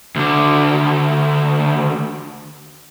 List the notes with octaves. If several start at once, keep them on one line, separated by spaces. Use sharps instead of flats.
D2 D3